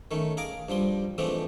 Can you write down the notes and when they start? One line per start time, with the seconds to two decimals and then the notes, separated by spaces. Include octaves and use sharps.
0.11 D#3 A3 C#4
0.37 G#4 F5 A#5 D6
0.69 G2 F3 G3 C6
1.18 E3 F3 G#3 A3 C4 D4